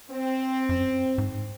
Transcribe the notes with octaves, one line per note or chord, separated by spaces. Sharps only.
C4
F#2
G#2